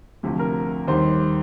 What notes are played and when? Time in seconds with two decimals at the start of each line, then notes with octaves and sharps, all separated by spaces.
0.23 D2 C3 F3
0.39 A#4
0.87 D#2 D#3 G3 C5